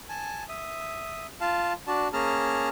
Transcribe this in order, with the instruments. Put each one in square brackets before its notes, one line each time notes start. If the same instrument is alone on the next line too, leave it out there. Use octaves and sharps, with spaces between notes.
[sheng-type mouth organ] G#5 A5
E5 D#6
F4 F5 A5
D4 F#4 D5 A5
A#3 C#4 G#4 A5 A#5 F6